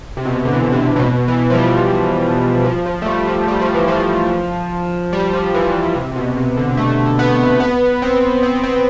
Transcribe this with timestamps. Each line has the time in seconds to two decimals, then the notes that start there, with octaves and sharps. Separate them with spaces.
0.17 C3
0.25 B2
0.33 C3
0.45 D3
0.53 E3
0.62 D3
0.72 C3
0.96 A2
0.99 B2
1.28 E3
1.50 F3
1.55 G3
2.65 F3
2.86 F3
3.02 A3
3.06 G3
3.27 F3
3.48 G3
3.61 F3
3.74 E3
3.88 F3
5.13 G3
5.33 F3
5.54 E3
5.95 C3
6.11 C3
6.16 B2
6.37 C3
6.57 D3
6.77 A3
7.19 B3
7.60 B3
8.02 C4
8.43 C4
8.63 C4